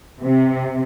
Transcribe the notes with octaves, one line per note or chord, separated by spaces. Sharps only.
C3